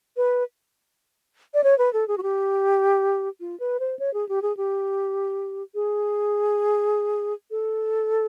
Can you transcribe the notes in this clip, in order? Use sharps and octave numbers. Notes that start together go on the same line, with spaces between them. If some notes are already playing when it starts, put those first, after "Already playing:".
B4
D5
C#5
B4
A4
G#4
F#4
G4
F4
B4
C5
C#5
G#4
G4
G#4
G4
G#4
A4